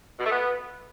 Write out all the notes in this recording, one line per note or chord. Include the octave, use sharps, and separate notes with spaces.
B2
A3
B3